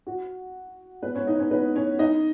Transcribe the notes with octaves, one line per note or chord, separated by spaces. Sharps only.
F#4
B3 B4
C#4 C#5
D#4 D#5
C#4 C#5
B3 B4
C#4 C#5
D#4 D#5